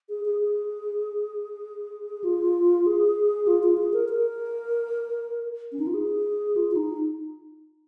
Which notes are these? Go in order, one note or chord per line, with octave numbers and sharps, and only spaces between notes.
G#4
G#4
G#4
F4
G#4
F4
F4
G#4
A#4
A#4
C#4
D#4
F4
G#4
F4
F4
D#4